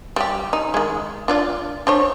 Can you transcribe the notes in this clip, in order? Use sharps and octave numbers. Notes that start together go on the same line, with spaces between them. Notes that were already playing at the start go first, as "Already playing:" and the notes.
G3 G4
D#4
D#3 G#3
D4 F4 D5
D4 C5 C#5